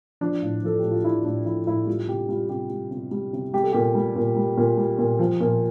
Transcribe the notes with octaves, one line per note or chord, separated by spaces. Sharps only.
F3 D4
A2
F3 A4
A2 G4
F4
F3 E4
A2 D4
F3 E4
A2 E4
G3 F4
C3 G4
G3 F4
C3 G4
G3
C3
G3
C3
G3 G4
A4
A#2 G4
G3
A#2
G3
A#2
G3
A#2
F3
A#2